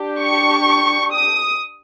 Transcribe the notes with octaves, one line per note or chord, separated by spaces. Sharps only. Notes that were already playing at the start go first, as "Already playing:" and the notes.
Already playing: D4 G4
C#6
D#6